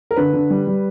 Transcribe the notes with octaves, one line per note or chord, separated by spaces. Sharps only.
A#4
D3 B4
D3
G3
G3